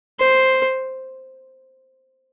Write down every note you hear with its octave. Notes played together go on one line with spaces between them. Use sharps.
C5